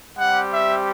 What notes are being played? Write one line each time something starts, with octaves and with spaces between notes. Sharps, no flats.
G3 C4 G4 F#5
E5